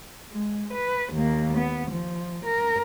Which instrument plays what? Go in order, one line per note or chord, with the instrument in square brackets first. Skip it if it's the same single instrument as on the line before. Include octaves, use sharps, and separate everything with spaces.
[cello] G#3
B4
D#2 A#3
B3
F3
A#4